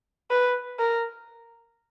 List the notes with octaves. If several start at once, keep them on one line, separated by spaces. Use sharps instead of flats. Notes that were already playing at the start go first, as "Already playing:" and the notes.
B4
A#4